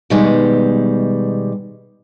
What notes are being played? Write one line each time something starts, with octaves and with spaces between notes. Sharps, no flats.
B2 D#3 G3 G#3